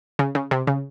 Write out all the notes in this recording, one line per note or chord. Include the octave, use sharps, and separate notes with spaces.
C#3
C#3
C3
C#3